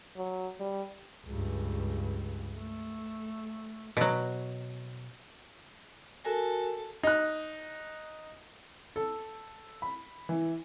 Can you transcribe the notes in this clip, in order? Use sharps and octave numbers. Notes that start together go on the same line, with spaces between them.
F#3
G3
C#2 G2
A3
B2 F#3
F#4 A4 A#4 G#5
D#4 F#6
A4
B5
E3